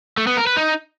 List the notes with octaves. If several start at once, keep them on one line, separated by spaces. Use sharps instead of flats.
A3
B3
A#4
B4
D#4